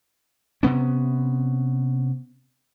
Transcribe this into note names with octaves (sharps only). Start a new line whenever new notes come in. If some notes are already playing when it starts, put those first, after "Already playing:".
C3 B3 C#4